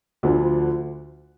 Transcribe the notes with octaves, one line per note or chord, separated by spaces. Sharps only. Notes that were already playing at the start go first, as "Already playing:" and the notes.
D2 D3 F3